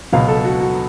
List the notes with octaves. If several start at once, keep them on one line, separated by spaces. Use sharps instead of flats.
C#2 B2 F#3 F5
A4
F#4
F#4